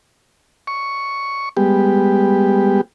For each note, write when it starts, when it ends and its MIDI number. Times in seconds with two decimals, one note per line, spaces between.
0.67 1.49 85
1.57 2.81 55
1.57 2.81 56
1.57 2.81 59
1.57 2.81 67